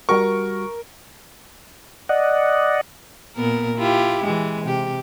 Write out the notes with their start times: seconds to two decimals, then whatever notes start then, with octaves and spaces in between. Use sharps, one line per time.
0.09 G3 F#4 A#4 A#5 C#6
2.09 D5 D#5 F#5
3.36 A#2 B3 A#4
3.78 E4 F4 G4
4.24 E3 G#3
4.66 C3 G4